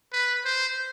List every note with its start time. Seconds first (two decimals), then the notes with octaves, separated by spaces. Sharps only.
0.13 B4
0.45 C5